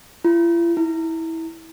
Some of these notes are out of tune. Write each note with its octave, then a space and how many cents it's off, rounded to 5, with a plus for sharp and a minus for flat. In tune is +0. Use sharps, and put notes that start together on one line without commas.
E4 +45
E4 -20